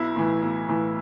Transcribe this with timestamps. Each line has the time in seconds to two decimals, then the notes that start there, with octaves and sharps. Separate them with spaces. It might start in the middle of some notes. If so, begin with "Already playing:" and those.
Already playing: B1 E4
0.16 A2 E3
0.42 B1
0.69 A2 E3